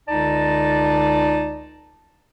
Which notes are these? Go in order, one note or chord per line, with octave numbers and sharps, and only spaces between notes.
C#2 D3 D#4 D5 A5